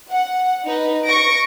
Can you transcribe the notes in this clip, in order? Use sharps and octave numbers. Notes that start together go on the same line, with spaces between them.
F#5
D#4 B4
C#6 A#6 D7